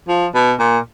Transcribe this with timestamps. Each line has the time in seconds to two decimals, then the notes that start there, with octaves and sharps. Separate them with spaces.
0.08 F3
0.35 B2
0.59 A#2